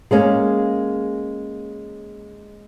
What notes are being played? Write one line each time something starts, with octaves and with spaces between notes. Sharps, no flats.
G#3 A#3 C#4